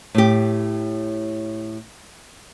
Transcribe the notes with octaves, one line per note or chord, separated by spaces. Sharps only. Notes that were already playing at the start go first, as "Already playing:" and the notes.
A2 G4